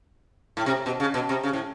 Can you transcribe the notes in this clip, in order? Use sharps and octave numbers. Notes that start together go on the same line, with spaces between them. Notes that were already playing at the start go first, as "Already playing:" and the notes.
A2
C3
B2
C#3
B2
C3
C#3
A2